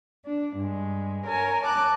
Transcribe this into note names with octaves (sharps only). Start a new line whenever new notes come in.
D4
G2 G#3
A#4 C#5 G#5
A5 D6 F#6